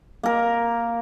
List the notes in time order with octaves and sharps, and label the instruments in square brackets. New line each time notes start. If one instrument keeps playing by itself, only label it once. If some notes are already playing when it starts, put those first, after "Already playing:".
[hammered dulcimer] A#3 A#4